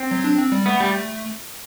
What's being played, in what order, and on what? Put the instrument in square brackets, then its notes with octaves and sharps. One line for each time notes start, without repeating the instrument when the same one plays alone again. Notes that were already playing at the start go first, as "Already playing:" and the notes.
Already playing: [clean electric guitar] C4
[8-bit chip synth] F#3
D4
C4
G3
[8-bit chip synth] A3 [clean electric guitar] B3
[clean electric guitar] G3